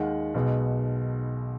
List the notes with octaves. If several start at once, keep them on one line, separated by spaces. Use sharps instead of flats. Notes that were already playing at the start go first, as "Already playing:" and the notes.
Already playing: D#2 D#3 G#3 F#5
B1 B2 G#3